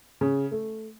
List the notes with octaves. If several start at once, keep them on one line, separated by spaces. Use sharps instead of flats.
C#3
A3